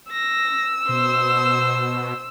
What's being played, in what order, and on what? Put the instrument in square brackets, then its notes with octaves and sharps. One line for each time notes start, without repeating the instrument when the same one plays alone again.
[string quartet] E6 [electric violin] A#6
[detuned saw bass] B2 [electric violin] C5